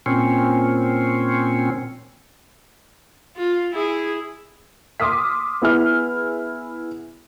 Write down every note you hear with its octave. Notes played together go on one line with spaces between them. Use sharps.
A#2 C4 C#4
F4
E4 G#4
C6 D6 D#6 F6 B6
B3 E4 G#4 F6